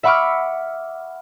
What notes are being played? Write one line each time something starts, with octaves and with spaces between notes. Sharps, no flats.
E5 F#5 B5 C#6 D6 F6